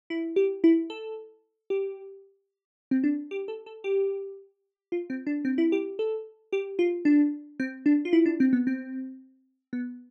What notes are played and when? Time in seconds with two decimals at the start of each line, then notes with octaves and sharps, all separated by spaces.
0.10 E4
0.36 G4
0.64 E4
0.90 A4
1.70 G4
2.91 C4
3.04 D4
3.31 G4
3.48 A4
3.66 A4
3.84 G4
4.92 F4
5.10 C4
5.27 D4
5.45 C4
5.58 E4
5.72 G4
5.99 A4
6.53 G4
6.79 F4
7.05 D4
7.60 C4
7.86 D4
8.05 F4
8.13 E4
8.26 D4
8.40 C4
8.53 B3
8.67 C4
9.73 B3